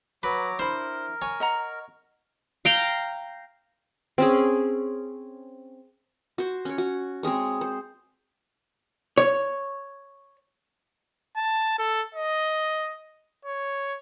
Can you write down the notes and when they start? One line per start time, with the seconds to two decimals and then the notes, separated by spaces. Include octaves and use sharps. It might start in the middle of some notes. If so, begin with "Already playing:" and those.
0.23 F#3 B4 A#5 D6
0.59 D4 E4 A#4 C5 B5
1.22 C#5 G#5
1.40 D#5 F#5 A#5
2.65 F5 G5 A#5
4.18 C4 C#4 G#4
6.38 F#4 C5
6.65 C#4 C#5
6.78 F#4
7.23 G#3 C4 G#4 C#5
7.61 C5
9.18 C#5
11.37 A5
11.79 A4
12.15 D#5
13.45 C#5